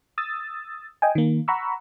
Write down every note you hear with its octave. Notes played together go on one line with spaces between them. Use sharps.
D#6 E6 A6
D#5 G5 G#5
D#3 A#3
F#5 A#5 B5 C#6 E6